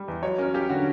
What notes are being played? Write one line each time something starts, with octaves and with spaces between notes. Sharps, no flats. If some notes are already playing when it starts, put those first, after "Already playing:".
Already playing: G3
E2
F#3 C#5
C#4 A#4
C#4 G4
D3 F#4